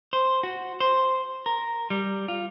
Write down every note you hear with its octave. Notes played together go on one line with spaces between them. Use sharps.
C5
F#4
C5
A#4
G3
F4